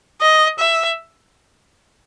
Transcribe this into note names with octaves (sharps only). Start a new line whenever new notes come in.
D#5
E5